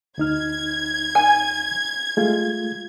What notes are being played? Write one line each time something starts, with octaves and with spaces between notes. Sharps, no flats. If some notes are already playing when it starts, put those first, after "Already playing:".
D2 D#4 F6 G#6
G#5
G#3 A3 F4